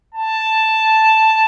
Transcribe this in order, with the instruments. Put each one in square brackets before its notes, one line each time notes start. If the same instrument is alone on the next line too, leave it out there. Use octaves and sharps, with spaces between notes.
[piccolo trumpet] A5